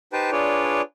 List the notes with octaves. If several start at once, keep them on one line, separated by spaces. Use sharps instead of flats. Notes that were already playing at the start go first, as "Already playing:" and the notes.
D#4 G4 B4 C5 G5 A5
D4 F4 G#4 B4 C#5 D5